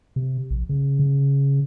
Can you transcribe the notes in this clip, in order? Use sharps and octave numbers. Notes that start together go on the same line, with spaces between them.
C3
A#1
C#3
C#3